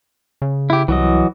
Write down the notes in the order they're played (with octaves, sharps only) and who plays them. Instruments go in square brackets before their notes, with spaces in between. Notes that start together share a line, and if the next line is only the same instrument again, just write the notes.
[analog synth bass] C#3
[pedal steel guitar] E4 G4
[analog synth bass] C2 [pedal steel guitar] E3 F#3 D#5